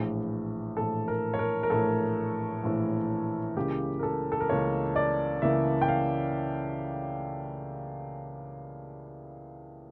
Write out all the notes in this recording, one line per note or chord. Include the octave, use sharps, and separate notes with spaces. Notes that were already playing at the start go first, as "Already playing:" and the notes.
Already playing: A#1 A2 E3
A#1 A2 E3 A4
A#4
C#5
A#4
A#4
A#1 A2 E3 A4
A#1 A2 E3
C#2 C#3 E3 A#3 G4
A#4
A4
A4
A#4
C#2 C#3 E3 A#3 C#5
D5
C#2 C#3 E3 A#3 E5
G5
F5